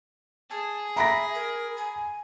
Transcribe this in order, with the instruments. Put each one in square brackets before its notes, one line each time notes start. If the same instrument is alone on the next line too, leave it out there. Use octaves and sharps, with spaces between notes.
[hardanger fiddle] G#4 [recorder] A5
[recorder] E5 [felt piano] A#5 B5 A#6
[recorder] A#4
G#5